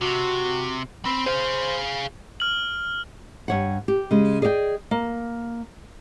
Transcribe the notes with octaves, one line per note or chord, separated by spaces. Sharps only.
C3 F#4
C4 B5
G#4 C5 F5
F6 F#7
G2 C#5 F#5
G4
C#3 G#3
G#4 D5 D#5 F5 G5
A#3